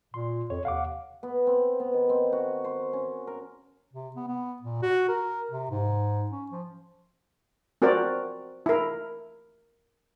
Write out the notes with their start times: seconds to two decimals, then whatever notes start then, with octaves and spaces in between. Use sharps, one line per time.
0.14 A#2 C6
0.50 F2 C#5
0.65 D#2 F5 F#5 D6
1.23 B3
1.47 C4
1.80 B3
1.94 D#3
2.09 C4
2.32 F#4
2.64 C5
2.93 C#4
3.27 A#4
3.93 C3
4.16 B3
4.28 B3
4.62 A#2
4.82 F#4
5.08 A#4
5.51 C3
5.70 G#2
6.31 C#4
6.51 F3
7.82 C4 F#4 A#4 C5 D5
8.66 E4 A#4